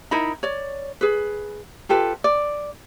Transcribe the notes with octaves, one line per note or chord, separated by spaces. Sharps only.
D#4 E4 A#4 B5
C#5 D5
G#4 B4
F4 G4 A4 B4
D5